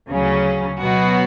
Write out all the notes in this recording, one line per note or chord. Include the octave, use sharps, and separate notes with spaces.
D2 C#3 F#3 C#4
B2 F#3 B3 F#4